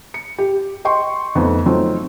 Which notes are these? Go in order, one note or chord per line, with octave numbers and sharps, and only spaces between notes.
C#7
G4
D#5 G5 C6 C#6
F2 A3 B3 D#4
F3 F#3 A3 C4 D#4 F4